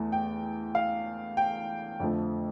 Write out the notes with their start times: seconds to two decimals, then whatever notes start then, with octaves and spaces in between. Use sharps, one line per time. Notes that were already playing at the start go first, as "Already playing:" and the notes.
Already playing: E2 E3 A3
0.12 G5
0.75 F5
1.37 G5
2.00 F2 D3 F3 A3